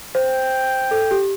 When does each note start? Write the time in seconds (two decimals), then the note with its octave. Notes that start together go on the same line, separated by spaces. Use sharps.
0.15 C5 G5
0.91 A4
1.11 G4